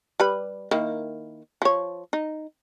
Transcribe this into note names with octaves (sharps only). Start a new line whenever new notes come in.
G3 B4 B5
D#3 A#3 E4
F3 C#5
D#4